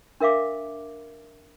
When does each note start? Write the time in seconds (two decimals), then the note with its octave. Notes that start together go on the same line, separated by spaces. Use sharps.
0.20 D4 A#4 E5 F5 D6